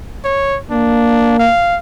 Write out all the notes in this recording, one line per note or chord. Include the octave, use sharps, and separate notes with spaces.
C#5
A#3 D4
F5